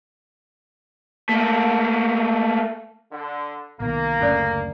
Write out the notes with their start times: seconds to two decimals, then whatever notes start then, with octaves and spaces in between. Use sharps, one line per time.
1.29 A3 A#3
3.12 D3
3.80 C2 B2 D#3 A#3
4.21 F#1 D2 C#4 A4 D5